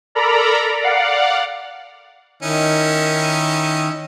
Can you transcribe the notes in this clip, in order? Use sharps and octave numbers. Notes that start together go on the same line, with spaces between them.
A4 A#4 D5 A#5 B5
D5 F5 F#5
D#3 C#4 D#4 E4